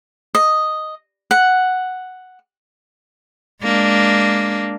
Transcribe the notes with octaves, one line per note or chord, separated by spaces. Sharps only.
D#5
F#5
G#3 A#3 D4